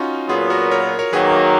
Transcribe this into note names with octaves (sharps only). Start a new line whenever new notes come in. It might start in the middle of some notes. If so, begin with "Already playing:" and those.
Already playing: C#4 D#4 F4 F#4
A#2 F#3 B3 F4 G#4
F#4 A#4
A#4 C#5
A#4 C#5
D#3 F#3 A#3 G#4 B4